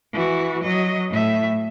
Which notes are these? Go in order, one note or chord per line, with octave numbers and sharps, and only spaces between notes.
E3 F#4
F#3 D#5
A2 E5